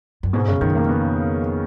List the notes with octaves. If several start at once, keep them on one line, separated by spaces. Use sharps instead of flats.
F#2
G#2 B2
F#2 C#3
F#2 D#3
F2 A#3
B3